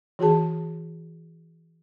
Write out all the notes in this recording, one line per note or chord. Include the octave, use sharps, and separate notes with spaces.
E3 F#4 G#4 A5